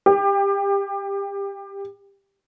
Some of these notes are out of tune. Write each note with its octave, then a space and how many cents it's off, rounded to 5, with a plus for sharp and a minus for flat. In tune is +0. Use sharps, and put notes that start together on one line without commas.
G4 +25